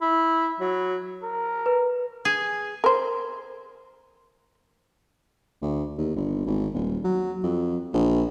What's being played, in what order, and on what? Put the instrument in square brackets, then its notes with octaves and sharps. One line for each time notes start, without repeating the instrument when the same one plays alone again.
[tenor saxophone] E4
F#3
[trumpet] A#4
[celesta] B4
[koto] G#4
[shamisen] A#4 C5
[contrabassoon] D2
D#2
G1
G#1
D#1
F#3
F2
A#1